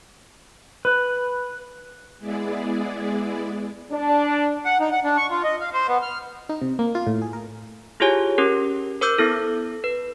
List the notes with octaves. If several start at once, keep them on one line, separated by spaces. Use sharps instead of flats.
B4
G#3 B3 E4 G#4 D5
D4
F#5
D#4
F#5
D4
C#6
F4
D#5
F5
C5
B3
F6
D#4
C3
A#3
F4
A2
G#4
A#4
E4 F4 G4 G#4 C#5 G#5
C#4 G4 A#4
A#4 C5 D6 E6 G6
B3 E4 A4
B4